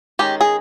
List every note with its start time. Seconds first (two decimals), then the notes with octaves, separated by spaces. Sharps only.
0.19 D#3 G#3 C#4 G4
0.41 G#4